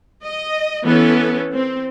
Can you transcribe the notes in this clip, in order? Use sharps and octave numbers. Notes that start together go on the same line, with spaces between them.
D#5
E3 B3 C#4 A4
C4